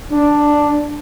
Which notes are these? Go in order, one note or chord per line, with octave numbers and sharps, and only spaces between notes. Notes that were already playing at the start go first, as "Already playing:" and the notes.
D4